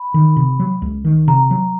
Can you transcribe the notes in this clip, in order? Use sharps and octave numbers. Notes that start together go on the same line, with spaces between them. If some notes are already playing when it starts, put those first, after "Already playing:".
Already playing: B5
D#3
C3
F#3
C#2
D#3
C3 A#5
F#3